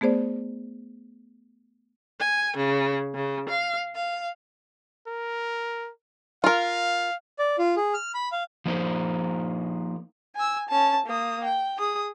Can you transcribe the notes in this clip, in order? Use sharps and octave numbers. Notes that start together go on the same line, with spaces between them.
A3 B3 G#4 C5 D5
G#5
C#3
C#3
F5
F5
A#4
F4 A#4 F5
D5
F4
G#4
F6
B5
F5
F3 A#3 D#4 C5
G#5 E6
C#4 A5
A#3 D#6
G5
G#4 D#6